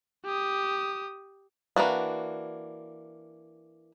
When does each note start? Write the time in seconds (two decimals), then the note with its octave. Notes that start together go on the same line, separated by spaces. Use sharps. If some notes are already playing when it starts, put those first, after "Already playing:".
0.25 G4 D#6
1.76 E3 A#3 D4 F#4